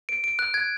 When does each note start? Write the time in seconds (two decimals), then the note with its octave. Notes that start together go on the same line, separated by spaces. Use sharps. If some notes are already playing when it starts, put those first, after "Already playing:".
0.09 D7
0.24 D7
0.39 F#6
0.54 G#6